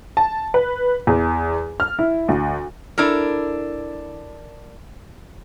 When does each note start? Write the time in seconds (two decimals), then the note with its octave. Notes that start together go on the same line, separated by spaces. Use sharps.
0.17 A5
0.54 B4
1.07 E2
1.80 F6
1.99 E4
2.28 D2
2.98 D4 E4 A4 A#4